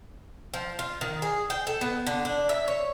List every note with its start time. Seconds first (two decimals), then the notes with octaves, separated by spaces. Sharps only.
0.54 F3
0.79 F4
1.01 D#3
1.22 G#4
1.50 G5
1.67 A4
1.81 B3
2.07 D3
2.25 D4
2.49 E5
2.68 C#5